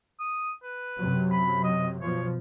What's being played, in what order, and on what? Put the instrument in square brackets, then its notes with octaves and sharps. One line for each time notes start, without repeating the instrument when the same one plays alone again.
[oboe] D#6
B4
[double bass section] F#2 C3 F#3
[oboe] B5
D#5
[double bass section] B2 F3 [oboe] C#5